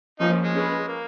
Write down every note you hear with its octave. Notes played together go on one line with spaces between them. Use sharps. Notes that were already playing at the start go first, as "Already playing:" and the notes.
F3 A#3 C#4 D#4
G#3
C#4 G#4 B4
A#3